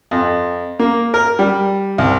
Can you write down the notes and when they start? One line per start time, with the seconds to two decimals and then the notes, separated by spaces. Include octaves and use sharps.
0.11 F2
0.79 A#3
1.14 A#4
1.39 G3
1.98 C2